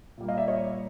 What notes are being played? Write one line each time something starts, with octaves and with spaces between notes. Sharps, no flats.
A#2 G3 A#3
D#5 F5
D5 E5
C#5 D#5